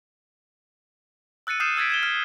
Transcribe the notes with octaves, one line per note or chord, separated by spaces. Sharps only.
E6 F#6 A6 C#7 D#7
D#6 F6 G6 C7 D#7 E7
E6 G#6 A6 B6 D7
G#6 E7 G7
F6